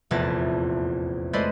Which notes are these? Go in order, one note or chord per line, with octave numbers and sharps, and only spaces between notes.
F1 A#1 E2 B4 A5 A#6
G#3 A3 B4 C5 D5 D#5